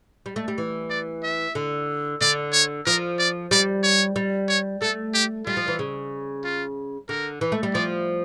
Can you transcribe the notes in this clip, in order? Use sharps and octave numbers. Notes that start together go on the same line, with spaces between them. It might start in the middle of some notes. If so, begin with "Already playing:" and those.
G3
A3
G3
E3
D5
E5
D3
D3 D5
C#5
F3 A#4
D5
G3 D5
C#5
G3
C#5
A3 A4
G4
G3 F4
F3
E3
C#3
F4
D3 A#4
E3
A3
G3
F3 D5